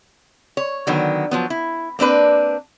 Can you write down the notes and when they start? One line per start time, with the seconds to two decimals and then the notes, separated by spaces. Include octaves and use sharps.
0.57 C#5
0.87 D3 D#3 F#3 B3
1.31 F3 F#3 B3
1.50 E4
1.99 A#3 C4 D4 B4